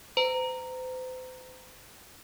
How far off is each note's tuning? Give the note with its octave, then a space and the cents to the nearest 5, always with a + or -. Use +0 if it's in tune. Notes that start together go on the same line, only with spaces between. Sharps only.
C5 -40 A#5 -10